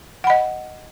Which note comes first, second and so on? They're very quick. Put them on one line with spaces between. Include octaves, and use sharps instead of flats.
F#5 B5 D#5